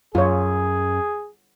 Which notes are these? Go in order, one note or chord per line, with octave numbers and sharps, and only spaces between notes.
F#2 F4 G#4 C#5